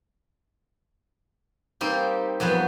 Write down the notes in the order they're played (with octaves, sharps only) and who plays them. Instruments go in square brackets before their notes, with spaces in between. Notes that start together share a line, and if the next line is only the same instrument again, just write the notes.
[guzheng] G3 A#3 C4 D#4 G4
F2 F#3 G3 B3